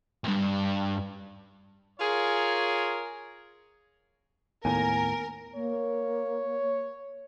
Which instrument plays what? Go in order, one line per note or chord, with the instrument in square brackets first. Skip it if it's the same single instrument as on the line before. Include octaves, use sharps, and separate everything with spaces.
[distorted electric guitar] C2 G2
[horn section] F4 G#4 A#4 C#5
[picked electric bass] D#2 A2 [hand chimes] B3 [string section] A#4 [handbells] G#5
[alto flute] A#3 [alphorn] C#5